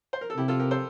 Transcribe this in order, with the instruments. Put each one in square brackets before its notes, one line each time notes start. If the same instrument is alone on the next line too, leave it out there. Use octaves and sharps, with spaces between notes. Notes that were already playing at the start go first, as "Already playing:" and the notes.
[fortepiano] C5
A#4
A4
[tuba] C3 [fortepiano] E4 G4
[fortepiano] F4 A4
G4 A#4
A4 C5